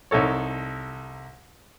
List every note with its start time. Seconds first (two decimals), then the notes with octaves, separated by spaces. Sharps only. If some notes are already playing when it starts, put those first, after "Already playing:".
0.11 C2 D#4 A4 C#5